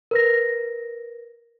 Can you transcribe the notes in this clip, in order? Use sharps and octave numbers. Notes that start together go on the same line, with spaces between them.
A#4 B4 A#6